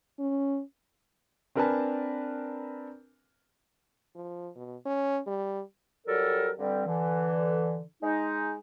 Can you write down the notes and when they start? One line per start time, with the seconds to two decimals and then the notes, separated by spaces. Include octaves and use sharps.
0.19 C#4
1.55 C4 D4 A#4 B4 G#5 A5
4.16 F3
4.56 B2
4.86 C#4
5.27 G3
6.07 F#3 G3 A4 A#4
6.58 G2 D3 G3 C4
6.86 D3 E3
8.02 G#3 D#4